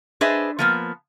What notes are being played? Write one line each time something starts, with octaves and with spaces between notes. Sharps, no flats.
D4 G#4 B4 C5 D#5 E5
F3 A#3 B3